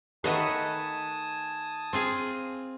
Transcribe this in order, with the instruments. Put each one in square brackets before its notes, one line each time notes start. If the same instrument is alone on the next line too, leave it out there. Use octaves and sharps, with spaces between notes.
[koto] D#3 A3 [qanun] B4 D#5 F#5 [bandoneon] G#5 A5 D#6
[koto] C4 F4 G#4